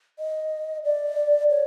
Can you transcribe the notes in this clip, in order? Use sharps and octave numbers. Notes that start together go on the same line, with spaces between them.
D#5
D5
C#5